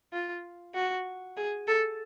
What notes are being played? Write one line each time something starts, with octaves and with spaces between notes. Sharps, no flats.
F4
F#4
G#4
A4